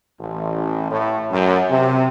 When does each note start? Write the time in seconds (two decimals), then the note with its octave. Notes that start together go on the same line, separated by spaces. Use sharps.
0.19 A1
0.90 A2
1.31 F#2
1.69 C3